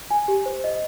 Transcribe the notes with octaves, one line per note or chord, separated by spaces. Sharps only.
G#5
G4
C5
D#5